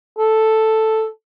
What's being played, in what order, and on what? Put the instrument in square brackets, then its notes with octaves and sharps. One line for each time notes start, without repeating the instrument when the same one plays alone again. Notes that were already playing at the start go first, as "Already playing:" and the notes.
[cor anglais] A4